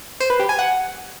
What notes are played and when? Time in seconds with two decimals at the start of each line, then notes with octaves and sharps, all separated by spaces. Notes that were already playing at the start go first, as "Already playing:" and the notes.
0.20 C5
0.30 B4
0.40 G4
0.49 G#5
0.59 F#5